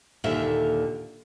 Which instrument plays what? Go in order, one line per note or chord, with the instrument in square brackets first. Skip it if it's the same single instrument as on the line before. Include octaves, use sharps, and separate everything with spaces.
[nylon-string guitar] D#2 A#2 D3 A#4 E5